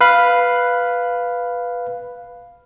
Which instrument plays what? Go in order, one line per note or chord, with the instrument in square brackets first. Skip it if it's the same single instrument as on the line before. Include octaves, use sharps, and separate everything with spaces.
[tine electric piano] B4 F5 B5